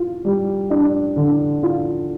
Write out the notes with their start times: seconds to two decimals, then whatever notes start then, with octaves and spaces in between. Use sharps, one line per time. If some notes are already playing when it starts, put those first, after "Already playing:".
Already playing: F4
0.25 G3
0.70 D4
1.16 D3
1.63 F4